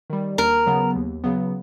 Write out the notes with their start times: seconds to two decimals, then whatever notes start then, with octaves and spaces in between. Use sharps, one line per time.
0.10 D#3 G3
0.38 D#2 A#4
0.67 C#3 F#3 B3
0.95 D#2
1.24 C#3 F#3 B3